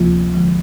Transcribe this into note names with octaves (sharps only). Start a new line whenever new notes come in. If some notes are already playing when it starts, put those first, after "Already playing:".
Already playing: D2 C3 F3 A#3 F4
D3 F3 G#3